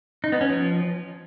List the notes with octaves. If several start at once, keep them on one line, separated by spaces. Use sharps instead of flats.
D#4
B3
C#4
F3